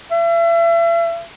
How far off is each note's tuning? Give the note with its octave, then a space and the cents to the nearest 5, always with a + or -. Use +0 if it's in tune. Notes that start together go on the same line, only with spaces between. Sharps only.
E5 +40